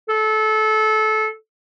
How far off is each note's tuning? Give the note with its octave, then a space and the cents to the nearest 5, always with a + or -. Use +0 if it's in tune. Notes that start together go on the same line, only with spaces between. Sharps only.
A4 -25